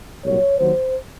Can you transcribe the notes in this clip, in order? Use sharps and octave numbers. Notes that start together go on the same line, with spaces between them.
C2 A#2 F#3 C#5
D#2 D#3 F#3 C5